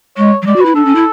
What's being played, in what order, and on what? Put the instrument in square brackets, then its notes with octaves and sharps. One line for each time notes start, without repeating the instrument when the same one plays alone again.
[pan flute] G#3 [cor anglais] C#5
[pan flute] F#3
[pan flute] G#3 [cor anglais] D5
[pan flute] F#4
[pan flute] E4 [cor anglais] B4
[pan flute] D4 [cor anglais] A4
[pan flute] C#4
E4